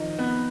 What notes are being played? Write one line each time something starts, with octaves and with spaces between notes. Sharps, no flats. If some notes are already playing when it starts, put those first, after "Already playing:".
Already playing: D#3 F3 D#4
B3